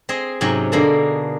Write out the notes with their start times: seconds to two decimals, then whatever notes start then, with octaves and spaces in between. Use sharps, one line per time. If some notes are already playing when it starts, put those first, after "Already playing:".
0.09 C4 G#4 D#5 C6
0.41 G#2 C3 F#3 C#4 G5
0.72 B2 D3 A#3 G#4 A4